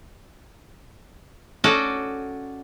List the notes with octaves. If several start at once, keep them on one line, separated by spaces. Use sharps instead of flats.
C#4 F#4 A4 D5 D#5